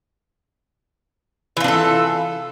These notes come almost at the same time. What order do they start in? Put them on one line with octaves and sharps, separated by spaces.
E3 F4 D4 A4